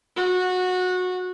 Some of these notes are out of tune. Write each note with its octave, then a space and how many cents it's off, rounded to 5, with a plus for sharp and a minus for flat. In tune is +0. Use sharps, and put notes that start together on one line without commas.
F#4 -20